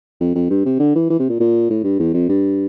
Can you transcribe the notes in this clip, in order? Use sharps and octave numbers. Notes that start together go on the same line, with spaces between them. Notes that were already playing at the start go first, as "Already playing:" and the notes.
F2
F2
G2
C3
D3
E3
E3
C3
A#2
A#2
A2
G2
E2
F2
G2